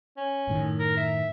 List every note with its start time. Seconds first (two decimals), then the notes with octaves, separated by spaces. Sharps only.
0.17 C#4
0.47 F#2 A2 D#3
0.79 A#4
0.97 E5